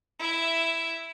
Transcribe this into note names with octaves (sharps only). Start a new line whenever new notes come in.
E4 E5